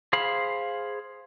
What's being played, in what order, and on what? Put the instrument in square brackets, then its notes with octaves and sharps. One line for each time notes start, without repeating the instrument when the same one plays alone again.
[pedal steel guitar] G#4 C5 F5 B5